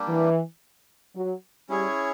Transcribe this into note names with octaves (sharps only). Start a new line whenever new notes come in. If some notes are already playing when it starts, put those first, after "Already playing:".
Already playing: G3 A#3 D4 G4
E3
F#3
G3 C#4 E4 G#4 C#5